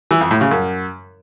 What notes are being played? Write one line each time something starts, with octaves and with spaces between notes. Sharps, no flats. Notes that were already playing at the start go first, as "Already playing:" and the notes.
E3
F2
A2
C#3
F#2